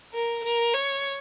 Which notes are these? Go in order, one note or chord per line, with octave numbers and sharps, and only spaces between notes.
A#4
A#4
C#5